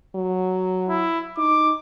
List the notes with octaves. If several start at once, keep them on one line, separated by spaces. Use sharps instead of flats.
F#3
E4
D#4 D6